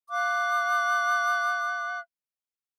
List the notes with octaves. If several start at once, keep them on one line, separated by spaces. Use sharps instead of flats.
F5 D6 F#6